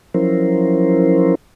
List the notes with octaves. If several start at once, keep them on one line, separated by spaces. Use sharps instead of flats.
F3 F#3 C#4 E4 A#4 C5